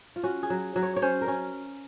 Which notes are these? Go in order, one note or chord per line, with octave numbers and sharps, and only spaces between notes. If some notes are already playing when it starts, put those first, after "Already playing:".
F4
C#4 F#4
G#4
F#3
F#3
C#5
C#5
C#4 C5
A#4
C#4